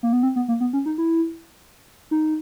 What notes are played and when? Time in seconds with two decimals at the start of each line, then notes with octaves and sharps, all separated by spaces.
0.03 A#3
0.13 B3
0.23 C4
0.36 B3
0.48 A#3
0.61 B3
0.73 C#4
0.86 D#4
0.98 E4
2.11 D#4